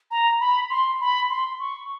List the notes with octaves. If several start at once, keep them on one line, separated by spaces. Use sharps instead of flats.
A#5
B5
C6
B5
C6
C#6